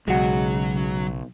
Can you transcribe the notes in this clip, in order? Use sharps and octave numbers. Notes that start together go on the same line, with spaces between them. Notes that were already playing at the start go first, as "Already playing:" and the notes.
B1 C#3 F#3 G#3 F#4